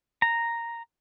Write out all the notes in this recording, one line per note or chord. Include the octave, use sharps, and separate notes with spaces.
A#5